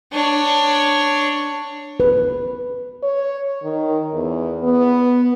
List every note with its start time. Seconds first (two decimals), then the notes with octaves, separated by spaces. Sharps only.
0.13 D4 C#5
2.00 B4
3.03 C#5
3.63 D#3
4.14 E2
4.64 B3